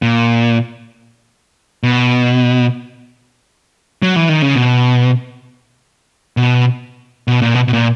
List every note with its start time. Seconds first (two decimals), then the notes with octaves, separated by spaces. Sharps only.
0.02 A#2
1.83 B2
4.02 F#3
4.16 E3
4.29 D#3
4.42 C#3
4.55 B2
6.37 B2
7.28 B2
7.42 A#2
7.55 B2
7.68 B2
7.73 A#2